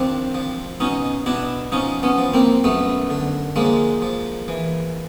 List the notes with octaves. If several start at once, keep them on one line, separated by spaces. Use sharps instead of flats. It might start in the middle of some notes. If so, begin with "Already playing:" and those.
Already playing: D#3 F3 C4 D4
F3
B2 C#4 D#4
B2 D4 E4
F3 C#4 D#4
B3 C#4
F3
A#3 C4
F#2 A3 B3
D3
F3 G#3 A#3
F3
E3